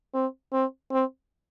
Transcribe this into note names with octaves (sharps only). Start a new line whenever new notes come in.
C4
C4
C4